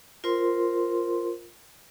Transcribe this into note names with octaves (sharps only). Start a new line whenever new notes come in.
F4 A#4 C5 C6